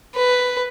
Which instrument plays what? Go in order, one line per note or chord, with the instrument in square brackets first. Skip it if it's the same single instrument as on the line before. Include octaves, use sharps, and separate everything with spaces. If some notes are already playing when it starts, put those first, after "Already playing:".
[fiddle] B4